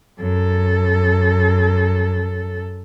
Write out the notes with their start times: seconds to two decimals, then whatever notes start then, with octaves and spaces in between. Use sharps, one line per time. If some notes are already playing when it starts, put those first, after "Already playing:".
0.19 F#2 A4